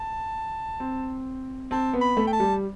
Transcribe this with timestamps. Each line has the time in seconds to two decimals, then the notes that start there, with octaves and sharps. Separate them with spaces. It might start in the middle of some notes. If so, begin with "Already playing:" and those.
Already playing: A5
0.80 C4
1.71 C4 A5
1.94 B3
2.01 B5
2.17 A3
2.27 G5
2.33 A5
2.40 G3